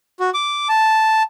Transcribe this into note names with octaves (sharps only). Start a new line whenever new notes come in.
F#4
D6
A5